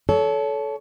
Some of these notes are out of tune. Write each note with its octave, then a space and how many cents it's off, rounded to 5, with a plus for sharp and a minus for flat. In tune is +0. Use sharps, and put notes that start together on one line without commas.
A4 -20 C#5 +25